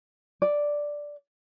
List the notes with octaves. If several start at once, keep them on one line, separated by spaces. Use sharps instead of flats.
D5